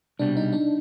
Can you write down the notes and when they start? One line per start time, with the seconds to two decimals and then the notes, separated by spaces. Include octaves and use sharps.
0.19 C2 B2 G3 D4
0.37 D#4
0.53 D4